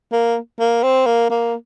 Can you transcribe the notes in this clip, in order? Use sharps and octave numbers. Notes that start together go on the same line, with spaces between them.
A#3
A#3
C4
A#3
A#3